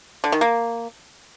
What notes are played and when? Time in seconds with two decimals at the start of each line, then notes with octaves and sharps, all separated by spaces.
0.24 D3
0.32 D#3
0.41 A#3